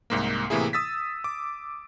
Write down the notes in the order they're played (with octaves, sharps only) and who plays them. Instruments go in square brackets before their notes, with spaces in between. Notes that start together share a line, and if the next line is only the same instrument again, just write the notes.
[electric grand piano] C2 G#2 A#3
A2 C3 E3 A#3 E4 G#4
D#6 E6 A6 B6
D6